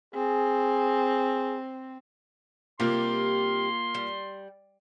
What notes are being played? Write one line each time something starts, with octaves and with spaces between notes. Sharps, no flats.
C4 G#4
C3 G3 A#3 F4 G4 C6
G3